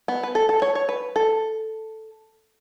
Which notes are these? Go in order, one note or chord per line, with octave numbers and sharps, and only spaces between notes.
B3
B4
A4
A4
C#5
C#5
B4
A4